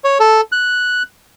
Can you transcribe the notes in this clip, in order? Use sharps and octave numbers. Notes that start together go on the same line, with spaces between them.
C#5
A4
F#6